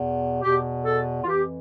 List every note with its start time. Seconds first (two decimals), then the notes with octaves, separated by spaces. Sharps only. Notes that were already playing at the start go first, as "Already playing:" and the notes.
Already playing: E2 B2
0.42 E2 B2 G4
0.85 A4
1.23 F4
1.27 F2 E3 G4